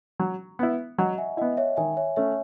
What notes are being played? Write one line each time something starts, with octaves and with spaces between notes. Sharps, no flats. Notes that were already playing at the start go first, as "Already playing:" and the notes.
F#3
B3 E4
F#3 D#5 F#5
E5 G#5
B3 E4 D#5 F#5
C#5 E5
D#3 E5 G#5
C#5 E5
A3 C#4 C#5 E5